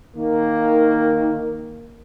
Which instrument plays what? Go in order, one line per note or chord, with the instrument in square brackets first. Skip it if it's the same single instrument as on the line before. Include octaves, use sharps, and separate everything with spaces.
[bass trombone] D#3 [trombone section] A#3